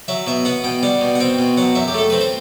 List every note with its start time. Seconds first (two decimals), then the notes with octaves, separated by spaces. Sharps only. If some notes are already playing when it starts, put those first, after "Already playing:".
0.08 F#3 E5
0.27 B2 E5
0.45 B3 F#5
0.64 B2 G5
0.83 G3 F#5
1.01 B2
1.15 F#5
1.20 C4 G5
1.39 B2
1.57 F#3 F#5
1.75 F#2 E5
1.88 G4
1.94 A3 A4
2.10 C4 B4
2.21 C5